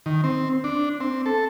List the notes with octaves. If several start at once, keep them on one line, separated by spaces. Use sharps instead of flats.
D#3
C4
D4
C4
A4